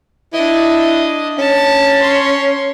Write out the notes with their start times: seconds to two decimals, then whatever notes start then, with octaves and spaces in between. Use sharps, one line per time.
0.33 D4 E4 D#5
1.38 C#4 A5
2.00 C#5 C6